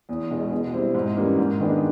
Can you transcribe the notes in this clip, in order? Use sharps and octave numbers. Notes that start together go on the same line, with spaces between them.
E2
B2 G#3
B2
G3 C4 E4
G#2
E3 G3 A#3 C#4
G#2
D#3 G#3 B3 D4